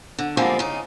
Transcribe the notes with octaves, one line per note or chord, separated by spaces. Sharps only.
D3
D3 F3 G3 G#3 A#3 C4
C#3 D#4